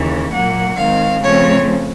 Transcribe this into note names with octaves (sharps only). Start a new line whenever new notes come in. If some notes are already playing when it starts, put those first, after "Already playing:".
Already playing: D#2 C#3 E3
A#2 F#3 A#3 F#5
D#3 G#3 C4 F5
C#3 F3 A3 C4 C#5